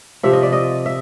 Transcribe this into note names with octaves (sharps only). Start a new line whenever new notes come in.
C3 F3 E5
D#5
D5
D#5
E5